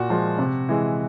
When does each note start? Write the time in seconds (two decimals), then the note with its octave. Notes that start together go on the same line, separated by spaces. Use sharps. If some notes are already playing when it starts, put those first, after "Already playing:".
Already playing: A#2 F#4
0.10 F3 G#3
0.39 C3
0.69 E3 G#3